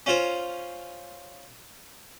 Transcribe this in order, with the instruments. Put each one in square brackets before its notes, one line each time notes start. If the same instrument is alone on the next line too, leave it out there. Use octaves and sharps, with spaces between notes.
[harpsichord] C#4 F4 C5